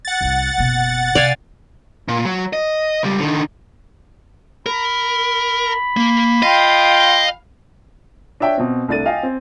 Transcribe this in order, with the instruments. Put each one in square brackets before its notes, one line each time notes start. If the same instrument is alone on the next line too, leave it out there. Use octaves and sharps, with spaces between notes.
[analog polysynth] F#5 A6
[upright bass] C2 E4
F#1 B2
[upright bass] C3 [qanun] D5 F5 G#5
[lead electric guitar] A#2
F#3
D#5
C#2 G3
D3 D#3
[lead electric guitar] A#4 [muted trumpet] B5
[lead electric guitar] A#3
[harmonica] F4 G5 [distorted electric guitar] D#5 [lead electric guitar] F5
[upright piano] D4 C#5 E5 G5
B2 C4
C2 A3 D4 A6 D#7
D#5 F5 G5 G#5
C4